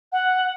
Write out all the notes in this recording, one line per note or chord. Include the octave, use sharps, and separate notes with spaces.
F#5